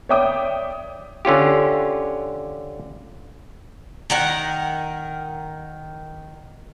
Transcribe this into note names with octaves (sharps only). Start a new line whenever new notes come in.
C#5 D5 E5 G5 D6 D#6
D3 C#4 F4 G4
D#3 A#4 F#5